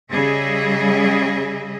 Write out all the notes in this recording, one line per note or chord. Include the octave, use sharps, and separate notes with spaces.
C#3 G3 G#4 D#5 E5